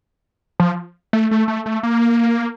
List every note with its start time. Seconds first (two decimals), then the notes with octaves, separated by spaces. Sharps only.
0.60 F3
1.13 A3
1.31 A3
1.48 A3
1.66 A3
1.83 A#3